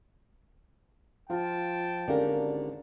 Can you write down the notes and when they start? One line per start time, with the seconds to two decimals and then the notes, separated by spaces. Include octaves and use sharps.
1.30 F3 F4 G5 A5
2.08 G#1 D3 C#4 G4 A#4 D5 F5